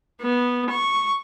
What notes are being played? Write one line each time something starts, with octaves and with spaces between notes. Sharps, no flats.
B3
C#6